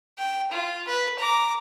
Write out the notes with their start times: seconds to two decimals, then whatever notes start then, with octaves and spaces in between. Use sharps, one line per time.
0.18 G5
0.51 F4
0.87 B4
1.19 A#5 D6